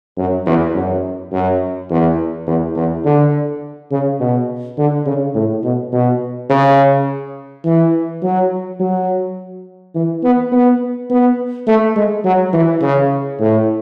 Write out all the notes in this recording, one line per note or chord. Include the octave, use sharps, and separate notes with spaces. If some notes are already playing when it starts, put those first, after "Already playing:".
F#2
E2
F#2
F#2
E2
E2
E2
D3
C#3
B2
D3
C#3
A2
B2
B2
C#3
E3
F#3
F#3
E3
B3
B3
B3
A3
G#3
F#3
E3
C#3
A2